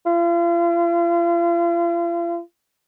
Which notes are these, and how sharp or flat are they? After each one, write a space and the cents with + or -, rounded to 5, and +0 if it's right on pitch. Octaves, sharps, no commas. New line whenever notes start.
F4 -40